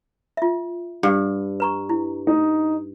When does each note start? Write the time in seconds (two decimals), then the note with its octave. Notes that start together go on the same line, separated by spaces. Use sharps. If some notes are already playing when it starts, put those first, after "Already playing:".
0.37 F4 E5
1.03 G2
1.60 B4 A#5 C#6
1.89 E4
2.27 D#4